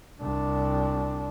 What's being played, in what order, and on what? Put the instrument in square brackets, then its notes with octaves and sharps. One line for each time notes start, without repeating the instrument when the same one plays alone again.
[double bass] C2 D4